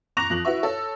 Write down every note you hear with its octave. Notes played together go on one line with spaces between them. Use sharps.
A#5 C#6 D6 F#6 A#6 F7
F2 F#6 F#7
E4 F#4 B4 E5 C#6
A4 C#5 E6